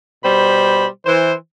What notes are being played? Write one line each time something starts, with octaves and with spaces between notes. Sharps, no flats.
B2 G3 C5 B5
E3 C5